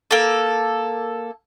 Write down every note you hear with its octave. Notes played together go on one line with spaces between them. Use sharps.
A#3 A4